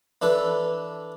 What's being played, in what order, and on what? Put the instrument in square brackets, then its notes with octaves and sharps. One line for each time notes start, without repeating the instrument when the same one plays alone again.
[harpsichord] E3 D4 A4 B4